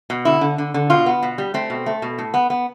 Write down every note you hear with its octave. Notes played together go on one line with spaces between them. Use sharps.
B2
D3 E4
D3
D3
D3
B2 F4
B3
B2
G3
A3 C4
B2
A3
B2
A2
B3
B3